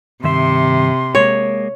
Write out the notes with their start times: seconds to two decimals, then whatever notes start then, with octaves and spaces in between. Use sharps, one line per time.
0.24 G2 C3 D#3 E5 C6
1.15 G#3 A#3 C#5